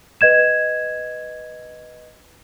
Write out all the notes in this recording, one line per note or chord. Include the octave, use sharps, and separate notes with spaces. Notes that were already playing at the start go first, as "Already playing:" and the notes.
B4 D#5 G#6 E7